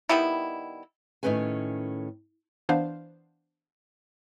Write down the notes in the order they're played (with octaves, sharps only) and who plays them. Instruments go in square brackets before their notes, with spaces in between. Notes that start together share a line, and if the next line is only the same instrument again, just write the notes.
[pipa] D#3 G3 B3 E4
[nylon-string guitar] A2 D#3 C4 C#4 B4 G#5
[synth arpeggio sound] E3 B3 D4 C5 F5